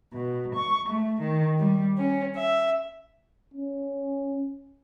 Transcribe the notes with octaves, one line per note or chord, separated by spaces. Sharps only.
B2
C#6
A3
D#3
G3
C#4
E5
C#4